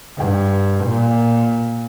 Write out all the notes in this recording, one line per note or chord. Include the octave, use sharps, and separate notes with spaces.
G2
A#2